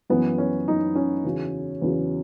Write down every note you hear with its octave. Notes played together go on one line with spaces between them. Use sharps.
F#2 E3 B3
C#4
F#2 E3 D#4
C#4
E2 C#3 F#3
E2 C#3 F#3